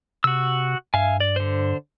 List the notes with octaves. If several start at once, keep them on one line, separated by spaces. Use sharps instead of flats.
C3 F#4 E6
G2 E5 F5 G#5
D5
D3 C5